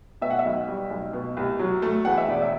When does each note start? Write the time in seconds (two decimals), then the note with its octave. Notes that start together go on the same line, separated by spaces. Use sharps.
0.22 B2 E5
0.31 F#5
0.39 E5
0.45 B1
0.68 G3
0.90 B1
1.13 B2
1.37 C2
1.59 F#3
1.82 A3
2.05 E2 F#5
2.18 E5
2.28 E1 D5
2.42 E5